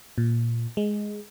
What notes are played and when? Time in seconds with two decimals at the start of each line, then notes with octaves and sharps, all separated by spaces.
0.18 A#2
0.77 G#3